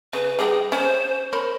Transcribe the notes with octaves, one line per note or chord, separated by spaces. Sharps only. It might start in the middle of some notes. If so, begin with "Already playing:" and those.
C#3 B4
G3 D#4 G#4 G5
C#4 C5
A#4 C5 C#5 B5